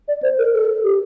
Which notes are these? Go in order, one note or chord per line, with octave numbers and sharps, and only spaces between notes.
D5
C5
A#4
A4
G4